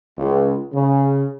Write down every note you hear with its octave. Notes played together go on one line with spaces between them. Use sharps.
C#2
C#3